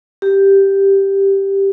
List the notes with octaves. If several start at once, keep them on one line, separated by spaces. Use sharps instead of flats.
G4